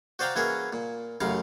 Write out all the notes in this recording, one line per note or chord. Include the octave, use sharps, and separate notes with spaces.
F#4 C5 D5 F5 G5 A#5
E3 A#3 C#4 F#4 G#4 A#4
A#2
A1 F#2 C#3 F5 A#5